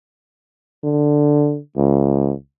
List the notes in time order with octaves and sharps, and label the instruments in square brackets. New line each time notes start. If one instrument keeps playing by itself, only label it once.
[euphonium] D3
C#2